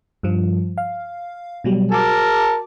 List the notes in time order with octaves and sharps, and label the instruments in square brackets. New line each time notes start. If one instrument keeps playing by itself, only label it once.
[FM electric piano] G2 F3
F5
B2 F#3 G3
[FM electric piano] F#4 D6 [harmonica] A#4 A5